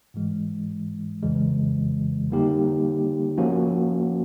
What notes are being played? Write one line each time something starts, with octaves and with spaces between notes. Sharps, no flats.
G#2 E3 G#3
F2 C#3 E3 G#3
D3 G3 A#3 D#4 G4
F3 A#3 C#4 F#4